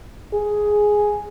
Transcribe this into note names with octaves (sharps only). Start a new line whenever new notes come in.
G#4